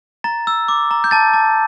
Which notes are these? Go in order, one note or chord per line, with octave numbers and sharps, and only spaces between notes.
A#5 A6
E6
D6
A#5
G6
A5 A6
A5